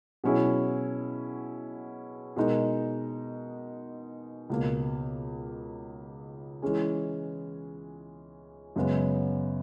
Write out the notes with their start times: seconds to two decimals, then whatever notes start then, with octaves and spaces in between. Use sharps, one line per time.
0.24 B2 F#3 C#4 E4 G#4
2.36 B2 G#3 D#4 A#4
4.50 C#2 B2 A#3
6.62 E3 G#3 C#4 G#4
8.76 F#2 C#3 G#3 B3